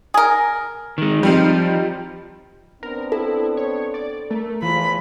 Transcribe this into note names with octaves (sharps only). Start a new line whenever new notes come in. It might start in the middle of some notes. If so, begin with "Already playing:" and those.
G#4 A#4
D#3 G#3
F3 G3 C4 D#4
B3 C4 D4 A#4
E4 A4
C#5
D5
A3 A#4
E2 E3 F3 F4 B5